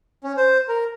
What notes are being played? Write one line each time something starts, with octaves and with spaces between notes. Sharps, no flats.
C#4
C5
A#4